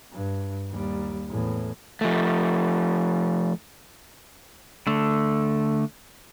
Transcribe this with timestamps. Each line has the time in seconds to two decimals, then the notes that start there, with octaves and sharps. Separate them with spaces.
0.13 G2
0.71 D#2 G3
1.30 E2 A2
2.01 F3 A3
4.87 D3 A3